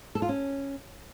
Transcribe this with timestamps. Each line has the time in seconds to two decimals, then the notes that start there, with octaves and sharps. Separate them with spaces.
0.15 A4
0.22 F4
0.29 C#4